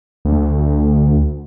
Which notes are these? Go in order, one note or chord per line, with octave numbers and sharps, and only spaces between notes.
D2